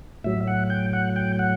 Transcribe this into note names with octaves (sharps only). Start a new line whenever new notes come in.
A2 F#3 E5
F#5
G5
F#5
G5
F#5